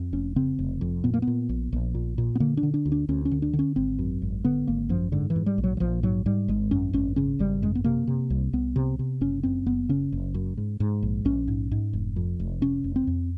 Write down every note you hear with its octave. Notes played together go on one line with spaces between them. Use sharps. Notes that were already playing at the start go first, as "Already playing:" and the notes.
Already playing: F2
F1 C#4
C#3 C4
F1
F2
A#2 B3
A#3
B3
A#2
A#1
A#1
A#2
A#2
B3
D3 A#3
D4
D3
D4
D2
D4
D2 C#4
C#4
D3
D4
D3
C#4
G#1 C4
F#2
G#1
D3 B3
G#1 A#3
F#2 F3
G#2 D3
E3
G#2
G3
A#1
F#3
F#3
A#1 F3
G#2 F#3
G#2 G3
G#1 G#3
F#2 C#4
G#1 C#4
C#3 C#4
G#1 G3
F#2 G#3
B3
C3 A#3
C3
C2
C2 B3
C3
C3
F#1 C#4
F#2 C4
F#1 B3
C#3 C#4
F#1
F#2
G#2
G#2
A#1
A#1 C#4
G#2
G#2
F1
F2
F1
C3 C#4
F1
C4
F2